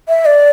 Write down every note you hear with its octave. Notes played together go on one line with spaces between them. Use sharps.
E5
D5